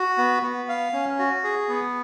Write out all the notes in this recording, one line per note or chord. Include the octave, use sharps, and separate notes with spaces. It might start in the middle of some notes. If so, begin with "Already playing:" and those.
Already playing: F#4
B3
B3
F5
C#4
F#4
G#4
B3